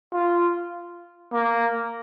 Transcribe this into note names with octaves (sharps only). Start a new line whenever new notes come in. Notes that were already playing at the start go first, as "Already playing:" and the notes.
F4
A#3